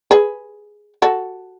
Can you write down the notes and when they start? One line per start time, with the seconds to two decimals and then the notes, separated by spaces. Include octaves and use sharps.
0.11 G#4 B4
1.02 F#4 A4